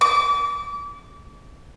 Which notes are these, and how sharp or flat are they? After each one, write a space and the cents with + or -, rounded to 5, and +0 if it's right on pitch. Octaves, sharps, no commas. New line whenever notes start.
D6 -30